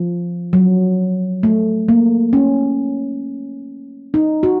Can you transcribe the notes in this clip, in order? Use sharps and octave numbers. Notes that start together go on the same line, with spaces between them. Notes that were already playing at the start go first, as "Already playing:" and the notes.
Already playing: F3
F#3
A3
A#3
C#4
D#4
F#4